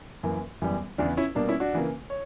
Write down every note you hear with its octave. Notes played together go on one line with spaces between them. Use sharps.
F#2 E3 A#3
F#2 E3 G3 B3
E2 C#3 E3 B3 D4
C#4 E4
B2 G3 A#3 D4
C#4 E4
D4 F#4
C#3 E3 A#3
C#5